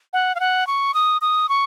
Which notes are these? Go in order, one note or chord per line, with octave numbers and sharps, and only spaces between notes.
F#5
F5
F#5
C#6
D#6
D#6
C#6